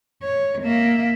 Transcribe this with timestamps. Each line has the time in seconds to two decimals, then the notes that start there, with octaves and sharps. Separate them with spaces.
0.22 C#5
0.62 A#3 E5